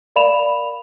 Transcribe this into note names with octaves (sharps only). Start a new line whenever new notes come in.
A#4 D5 F5 B5 E7 F7